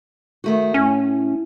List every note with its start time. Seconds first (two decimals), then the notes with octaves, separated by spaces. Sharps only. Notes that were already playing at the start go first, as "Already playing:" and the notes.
0.44 D#3 A3 F#4
0.74 A2 C#4